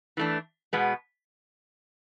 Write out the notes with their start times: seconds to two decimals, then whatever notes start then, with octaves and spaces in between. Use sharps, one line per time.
0.17 E3 A3 D4
0.73 B2 G#3 B3